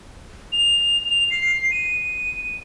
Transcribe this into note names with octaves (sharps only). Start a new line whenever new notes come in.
F7
C7
D#7